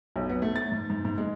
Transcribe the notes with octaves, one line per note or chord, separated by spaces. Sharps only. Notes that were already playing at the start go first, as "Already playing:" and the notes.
B1
B3
A3
A6
G#2
G#2
G#2
G#3